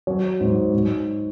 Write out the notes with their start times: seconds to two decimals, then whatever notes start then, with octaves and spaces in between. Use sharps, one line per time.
0.07 F#3 C#5
0.41 G#2
0.73 G#2